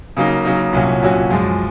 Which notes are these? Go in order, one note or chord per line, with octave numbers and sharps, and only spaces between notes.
C#3 F#3 A#3 D#4
C#3 F#3 A#3 D#4
C2 A#2 F#3 C#4 F#4
C2 A#2 F#3 C#4 F#4
F#2 F3 G#3